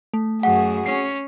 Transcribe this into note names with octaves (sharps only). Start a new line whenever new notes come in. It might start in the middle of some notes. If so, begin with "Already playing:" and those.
A3
F#2 F#4 G#4 F#5
C#4 C7